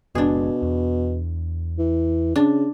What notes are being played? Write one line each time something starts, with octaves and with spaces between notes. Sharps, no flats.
F#1 B2 G#3 D4 G#4
E2
E3
C#3 D4